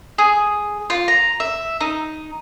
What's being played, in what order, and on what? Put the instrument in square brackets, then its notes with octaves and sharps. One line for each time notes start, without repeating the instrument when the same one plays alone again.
[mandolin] G#4
F4
A#5
E5
D#4